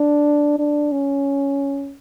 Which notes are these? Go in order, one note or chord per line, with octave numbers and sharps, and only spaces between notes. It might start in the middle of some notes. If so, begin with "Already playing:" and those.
Already playing: D4
D4
C#4